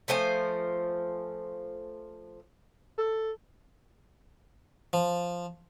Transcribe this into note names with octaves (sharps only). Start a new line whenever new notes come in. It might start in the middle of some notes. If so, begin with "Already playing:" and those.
F3 A3 C5 G#5
A4
F3